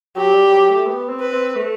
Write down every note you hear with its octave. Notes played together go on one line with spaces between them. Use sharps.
F#3 G4
G3
F#3
A3
B3
C4
B4
C4
A3